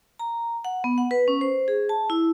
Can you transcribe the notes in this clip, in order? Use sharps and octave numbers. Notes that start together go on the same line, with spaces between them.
A#5
F#5
B3
F#5
B4
C#4
C5
G#4
A5
E4